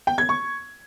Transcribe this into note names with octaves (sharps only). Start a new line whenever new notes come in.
G5
G#6
C#6